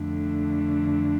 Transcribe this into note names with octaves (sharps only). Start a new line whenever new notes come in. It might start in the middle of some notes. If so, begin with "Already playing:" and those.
Already playing: F2 D3 A3 D4